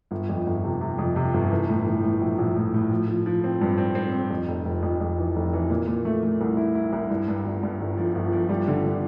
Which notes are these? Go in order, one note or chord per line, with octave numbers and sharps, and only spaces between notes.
G1
F2
G1
C3
C3
F2
C3
G1
E3
A2
E3
A2
A#1
A#1
A2
A2
F3
F3
F3
C4
G2
C4
C4
C4
F2
F1
F1
F2
F2
E3
F1
E3
A#2
A#2
A3
A3
C2
E4
E4
C2
G2
G2
G1
G2
G1
F3
G1
F3
G3
D3
D4